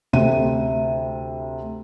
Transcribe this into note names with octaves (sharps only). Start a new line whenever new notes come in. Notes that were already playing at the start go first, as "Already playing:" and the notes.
D2 C3 D#7